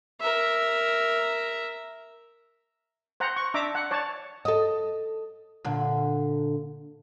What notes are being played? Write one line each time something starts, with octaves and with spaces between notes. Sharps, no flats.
A#4 E5
C5 F#5 A#5
C#6
D4 E5 A#5 D6
F#5
C#5 D5 A5
A4 D#5
A#2 D3